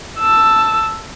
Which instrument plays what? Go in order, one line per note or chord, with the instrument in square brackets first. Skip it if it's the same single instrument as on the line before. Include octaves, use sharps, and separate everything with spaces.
[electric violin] A5 E6